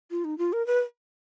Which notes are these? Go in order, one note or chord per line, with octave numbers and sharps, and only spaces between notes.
F4
D#4
F4
A#4
B4